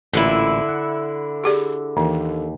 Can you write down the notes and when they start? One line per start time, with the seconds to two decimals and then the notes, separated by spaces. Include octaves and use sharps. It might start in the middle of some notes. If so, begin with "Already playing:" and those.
0.14 A1 A#2 D3 E4
0.69 F#5
1.44 G4 G#4 D5
1.97 D#2 E3